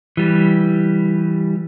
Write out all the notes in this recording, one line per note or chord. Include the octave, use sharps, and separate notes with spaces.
E3 G3